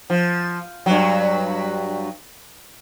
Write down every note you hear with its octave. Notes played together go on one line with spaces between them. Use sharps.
F3
G2 F#3